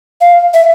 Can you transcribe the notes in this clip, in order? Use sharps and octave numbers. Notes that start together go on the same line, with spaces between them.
F5
E5